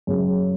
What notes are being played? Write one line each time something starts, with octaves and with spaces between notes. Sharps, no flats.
F#2 C#3 G#3